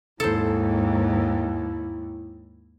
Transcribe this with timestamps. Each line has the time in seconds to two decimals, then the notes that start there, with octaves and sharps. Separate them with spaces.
0.20 D#2 G#2 E4 A4 C5